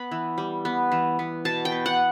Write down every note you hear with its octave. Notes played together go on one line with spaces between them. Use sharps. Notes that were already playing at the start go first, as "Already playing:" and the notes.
Already playing: B3 B5
E3
G3
B3
E3
B3
B2 A5
G5
B3
F#5